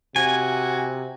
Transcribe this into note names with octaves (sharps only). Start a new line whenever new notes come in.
C3 F#4 G#5